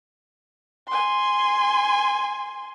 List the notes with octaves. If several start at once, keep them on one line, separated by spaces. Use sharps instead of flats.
G#5 C6